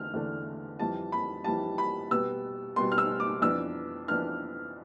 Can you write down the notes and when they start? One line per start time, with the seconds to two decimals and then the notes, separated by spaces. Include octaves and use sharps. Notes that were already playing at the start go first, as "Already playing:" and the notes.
Already playing: E2 D3 A3 F6
0.14 E2 D3 A3 D4
0.79 F2 E3 G3 A5
1.12 B5
1.44 F2 E3 G3 A5
1.78 B5
2.11 B2 G3 B3 E6
2.76 B2 G3 B3 C6
2.92 F6
2.98 E6
3.20 D6
3.42 F2 E3 B3 D4 E6
4.08 F2 E3 B3 D4 F6